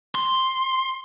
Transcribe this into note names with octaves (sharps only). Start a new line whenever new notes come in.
C6